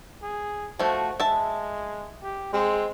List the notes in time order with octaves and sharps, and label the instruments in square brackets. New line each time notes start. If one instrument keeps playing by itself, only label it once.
[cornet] G#4
[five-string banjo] F3 A3 [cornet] F#4
[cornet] G#3 [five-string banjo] E5 A5
[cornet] G4
[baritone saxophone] G#3 [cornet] C4